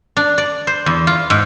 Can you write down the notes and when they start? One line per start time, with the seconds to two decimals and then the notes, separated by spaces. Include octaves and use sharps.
0.17 D4
0.38 D5
0.67 C5
0.86 E2
1.07 F4
1.30 G#2